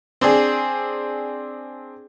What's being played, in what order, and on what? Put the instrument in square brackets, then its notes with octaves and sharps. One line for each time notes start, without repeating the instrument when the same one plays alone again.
[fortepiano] C4 D4 G#4